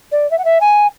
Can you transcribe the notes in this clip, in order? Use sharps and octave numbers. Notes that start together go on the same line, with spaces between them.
D5
E5
F#5
E5
G#5